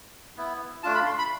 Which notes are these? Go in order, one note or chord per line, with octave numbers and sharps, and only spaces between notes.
B3 E4
A3 D4 F4 A5
B5
C6
B5